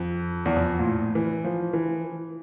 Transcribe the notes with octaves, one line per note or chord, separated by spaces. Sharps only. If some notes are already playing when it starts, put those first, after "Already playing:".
Already playing: F2
E2
F2
A#2
A2
E3
F3
E3